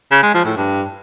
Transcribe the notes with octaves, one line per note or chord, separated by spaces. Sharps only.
C#3
G#3
F3
A2
G2